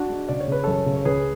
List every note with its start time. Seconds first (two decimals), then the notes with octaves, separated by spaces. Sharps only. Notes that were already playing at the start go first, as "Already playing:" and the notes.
Already playing: D4 F#4
0.09 G#3
0.28 C#3 D5
0.40 C#5
0.48 C#3 B4
0.64 F#2 A4 C#5
0.86 C#3
0.96 C#5
1.05 C#2 G#4 B4